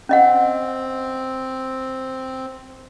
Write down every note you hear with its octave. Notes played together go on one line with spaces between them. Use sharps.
C4 C#4 D#5 F#5